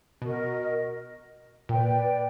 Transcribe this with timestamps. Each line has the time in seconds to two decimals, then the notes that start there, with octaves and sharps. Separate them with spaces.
0.21 B2 F#4 A#4 D#5
1.69 A#2 B4 D5 G5